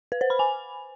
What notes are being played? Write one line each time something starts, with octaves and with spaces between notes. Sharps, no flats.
B4
C5
B5
G#5